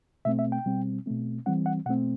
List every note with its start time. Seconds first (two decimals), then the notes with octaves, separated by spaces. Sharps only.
0.25 B2 A3 C4 E5
0.39 E5
0.52 G5
0.66 B2 G3 C4
1.06 B2 A3 C4
1.46 E3 G3 C4 F#5
1.66 F#5
1.86 B2 F#5
1.89 A3 C4